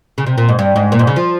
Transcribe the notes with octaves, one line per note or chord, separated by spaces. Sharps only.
C#3
C3
A#2
G#2
G2
G#2
A#2
G#2
C#3
F3